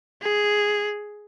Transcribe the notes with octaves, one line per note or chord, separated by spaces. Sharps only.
G#4